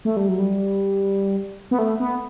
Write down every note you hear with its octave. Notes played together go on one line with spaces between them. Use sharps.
A3
G3
F#3
G3
B3
A3
B3